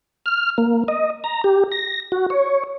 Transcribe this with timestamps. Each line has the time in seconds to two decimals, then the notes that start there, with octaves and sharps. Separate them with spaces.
0.26 F6
0.58 A#3
0.88 D#5
1.24 A#5
1.44 G4
1.72 A#6
2.12 F#4
2.30 C#5